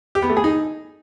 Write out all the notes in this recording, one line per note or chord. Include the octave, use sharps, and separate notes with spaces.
G4
B3
A3
G#4
D#4